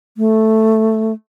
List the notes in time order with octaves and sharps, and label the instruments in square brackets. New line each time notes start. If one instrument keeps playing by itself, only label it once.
[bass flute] A3